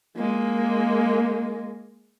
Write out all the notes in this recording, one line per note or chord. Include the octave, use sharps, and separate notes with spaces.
G#3 A#3